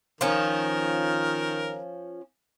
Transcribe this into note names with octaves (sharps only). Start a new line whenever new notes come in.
D#3 F3 C#4 A#4